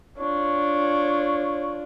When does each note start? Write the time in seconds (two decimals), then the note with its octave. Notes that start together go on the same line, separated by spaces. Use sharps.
0.18 D4 F4 C#5